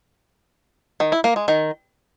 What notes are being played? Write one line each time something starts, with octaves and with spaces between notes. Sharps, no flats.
D#3
E4
A#3
G#3
D#3